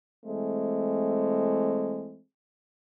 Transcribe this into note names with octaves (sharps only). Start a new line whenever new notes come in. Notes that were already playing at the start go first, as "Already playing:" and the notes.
E3 G#3 A3 C4